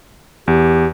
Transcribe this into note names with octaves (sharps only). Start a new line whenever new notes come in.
E2 G4